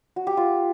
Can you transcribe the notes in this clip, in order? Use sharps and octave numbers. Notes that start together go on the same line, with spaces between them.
F#4
G4
F4